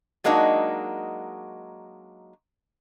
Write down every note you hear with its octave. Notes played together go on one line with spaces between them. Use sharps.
F#3 G#3 A#3 D4 D#4 F#4